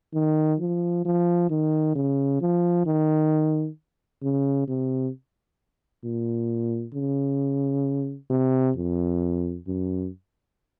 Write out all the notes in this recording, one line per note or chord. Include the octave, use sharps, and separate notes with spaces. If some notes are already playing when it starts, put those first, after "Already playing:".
D#3
F3
F3
D#3
C#3
F3
D#3
C#3
C3
A#2
C#3
C3
F2
F#2